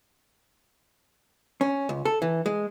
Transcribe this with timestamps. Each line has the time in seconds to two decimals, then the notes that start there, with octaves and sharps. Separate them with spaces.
1.61 C#4
1.89 C#2
2.05 A4
2.22 E3
2.46 G#3